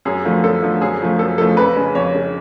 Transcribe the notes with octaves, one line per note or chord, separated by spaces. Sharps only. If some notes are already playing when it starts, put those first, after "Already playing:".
F#2 G#4
D3 F3 A3
F#2 A4
D3 F3 A3
F#2 G#4
C#3 F3 A3
F#2 A4
C#3 F3 A3 A4
F2 B4
C#3 G#3
F2 C#5
C#3 G#3